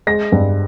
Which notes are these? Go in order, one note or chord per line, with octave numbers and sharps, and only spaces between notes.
G#3 A#6
G2